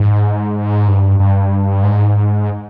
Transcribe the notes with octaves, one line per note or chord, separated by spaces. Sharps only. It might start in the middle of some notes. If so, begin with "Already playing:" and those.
Already playing: G#2
G2
G2
G#2